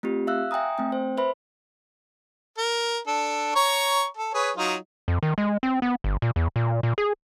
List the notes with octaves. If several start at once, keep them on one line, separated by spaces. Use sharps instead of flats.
A3 C4 F4 G4
E5 F5 E6 F#6
E5 G5 G#5 A#5 D#6
A3 C4 G5
C5
B4 C5 E5 B5
A#4
D4 A4
C#5 A#5 C#6
A4
G#4 B4 C#5
F#3 D#4 F4
F2
D#3
G#3
C4
B3
G1
A#2
E2
A#2
A#2
G#4